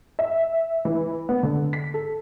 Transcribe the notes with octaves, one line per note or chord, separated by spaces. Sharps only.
E5
E3
B3
D3
B6
A4